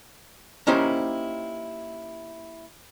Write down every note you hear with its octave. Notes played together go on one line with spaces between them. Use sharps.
A#3 C#4 D#4 E4 G4 C5